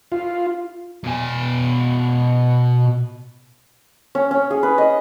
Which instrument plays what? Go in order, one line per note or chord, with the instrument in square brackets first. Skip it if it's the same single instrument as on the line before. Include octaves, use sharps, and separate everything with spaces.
[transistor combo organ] F4
[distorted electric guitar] B2 G#5
[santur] C#4
C#4
G#4
B4
D#5